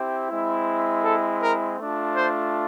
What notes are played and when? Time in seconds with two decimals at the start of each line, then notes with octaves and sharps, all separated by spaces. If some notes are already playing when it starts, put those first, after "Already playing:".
Already playing: C4 E4 G4
0.30 G#3 C4 E4
1.04 A4
1.42 A#4
1.78 A3 D4 F4
2.16 C5